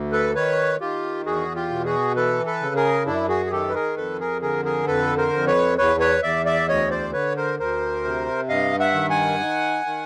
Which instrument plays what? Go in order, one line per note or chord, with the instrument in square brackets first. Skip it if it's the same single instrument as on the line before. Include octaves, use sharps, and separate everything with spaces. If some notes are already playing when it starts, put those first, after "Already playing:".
Already playing: [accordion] D2
A4 B4
D#3 B4 C#5
D#3 F4 G4
E2 F#4 G#4
F4 G4
B2
F#4 G#4
E3 A4 B4
A4 B4
C#3
G#4 A#4
F#2 D4 E4
F#4 G#4
G#4
D#3 G4 A4
B4
G#4 A#4
F2 A4 B4
G#4 A#4
D3 G#4 A#4
G#4 A#4
F2 A4 B4
A#4 C5
F2
B4 C#5
E2 B4 C#5
B4 C#5
E2 D5 E5
D5 E5
D2 C#5 D#5
C5 D5
D3 B4 C#5
A#4 C5
D2 A#4 C5
C3
G2 D#5 F5
E5 F#5
D#3
F#5 G#5
D#3
D#3